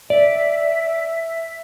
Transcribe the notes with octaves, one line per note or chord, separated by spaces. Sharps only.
D5 E5